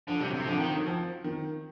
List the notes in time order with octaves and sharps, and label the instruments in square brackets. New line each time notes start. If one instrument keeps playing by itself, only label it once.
[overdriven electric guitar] D3 [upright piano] F3
[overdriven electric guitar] C3 [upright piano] G3
[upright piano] F#3
[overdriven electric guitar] C3
[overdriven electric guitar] D3 [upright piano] F3
[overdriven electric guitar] D#3
[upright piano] F#3
F3
D#3